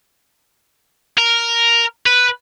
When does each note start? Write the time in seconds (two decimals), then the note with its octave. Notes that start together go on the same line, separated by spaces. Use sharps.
1.18 A#4
2.06 B4